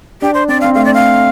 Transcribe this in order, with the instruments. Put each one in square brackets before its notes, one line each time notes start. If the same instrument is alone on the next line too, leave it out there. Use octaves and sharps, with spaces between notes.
[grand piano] D4 [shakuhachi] G4
[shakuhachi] C5
[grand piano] C4 [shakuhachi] D5
[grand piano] C4 [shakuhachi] F5
[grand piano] A3 [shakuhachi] F5
[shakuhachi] D5
F5